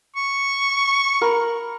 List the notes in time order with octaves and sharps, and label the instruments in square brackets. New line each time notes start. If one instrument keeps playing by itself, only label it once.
[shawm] C#6
[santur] A#4 B5